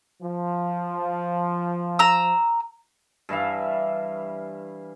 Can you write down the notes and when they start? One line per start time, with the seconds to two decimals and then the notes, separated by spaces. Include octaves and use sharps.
0.22 F3
1.99 A#5 E6
3.29 G2 E3 E5 F5